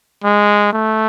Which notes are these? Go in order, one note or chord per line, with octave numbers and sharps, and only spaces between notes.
G#3
A3